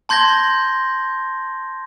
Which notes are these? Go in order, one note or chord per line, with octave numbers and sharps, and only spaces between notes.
A5 C6 G6 G#6 A#6 G7